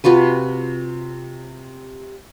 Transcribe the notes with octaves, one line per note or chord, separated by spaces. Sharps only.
C3 F4 F#4 B4